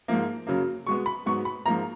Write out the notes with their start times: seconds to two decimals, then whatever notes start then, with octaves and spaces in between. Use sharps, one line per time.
0.08 G#2 F3 A#3
0.47 F#2 C#3 F#3 A#3
0.87 B2 G#3 B3 C#6
1.06 B5
1.26 G#2 F#3 B3 C#6
1.45 B5
1.66 G#2 F3 A#3 A#5